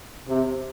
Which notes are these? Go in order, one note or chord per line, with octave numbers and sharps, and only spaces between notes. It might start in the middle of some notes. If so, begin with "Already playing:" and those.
C3